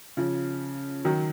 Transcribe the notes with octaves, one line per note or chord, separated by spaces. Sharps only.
C#3 F3
D#3 F#3